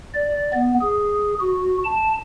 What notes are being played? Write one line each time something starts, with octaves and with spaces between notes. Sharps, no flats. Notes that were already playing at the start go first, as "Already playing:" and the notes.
D5
B3
G#4
F#4
A5